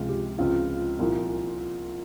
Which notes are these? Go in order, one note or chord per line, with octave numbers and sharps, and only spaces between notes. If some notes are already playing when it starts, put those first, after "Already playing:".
Already playing: C#2 C3 F3 G#3 F4
G4
C#2 C#3 F3 C4 F4
C2 A#2 F3 A#3